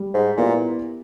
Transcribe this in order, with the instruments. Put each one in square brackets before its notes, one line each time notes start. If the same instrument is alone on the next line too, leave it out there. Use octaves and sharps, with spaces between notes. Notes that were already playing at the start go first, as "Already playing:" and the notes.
Already playing: [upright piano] G3
[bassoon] G#2
[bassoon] A#2 [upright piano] B3 E4 G4